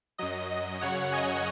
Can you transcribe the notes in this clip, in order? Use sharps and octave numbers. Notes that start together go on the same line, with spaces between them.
F#2 F#3 D#5
D#5
F#2 C#3 F#3 C#5 F#5
D#5 G#5